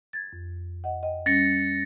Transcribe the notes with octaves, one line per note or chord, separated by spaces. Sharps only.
G#6 A6
F2
D#5 F#5
D#5 G5
G3 C#4 A6 A#6 C#7